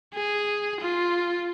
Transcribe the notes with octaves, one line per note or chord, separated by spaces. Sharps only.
G#4
F4